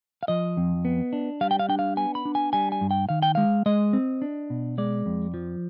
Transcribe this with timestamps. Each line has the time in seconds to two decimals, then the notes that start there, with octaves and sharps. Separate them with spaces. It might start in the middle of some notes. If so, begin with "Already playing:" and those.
0.23 F5
0.28 F3 D#5
0.57 F2
0.85 B3
1.13 D4
1.41 G3 F5
1.51 G5
1.59 F5
1.69 D4 G5
1.79 F5
1.97 B3 G#5
2.15 B5
2.25 D4
2.35 G#5
2.53 G3 G#5
2.72 G#5
2.81 G2
2.91 G5
3.09 D#3 F5
3.22 G5
3.35 G#3 F5
3.66 G#3 D#5
3.93 C4
4.22 D4
4.50 B2
4.78 G#3 D5
5.06 F2
5.34 F3